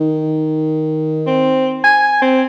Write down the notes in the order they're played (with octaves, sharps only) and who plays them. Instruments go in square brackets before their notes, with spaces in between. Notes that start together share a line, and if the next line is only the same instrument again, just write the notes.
[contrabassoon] D#3
[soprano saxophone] C4
G#5
C4